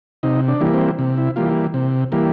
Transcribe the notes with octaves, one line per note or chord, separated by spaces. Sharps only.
C3 D#4
D4
E3 G3 A#3
C4
C3
E4
E3 G3 A#3 F4
C3
E3 G3 A#3